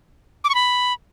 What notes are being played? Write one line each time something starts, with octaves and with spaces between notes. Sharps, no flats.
D6
C#6
B5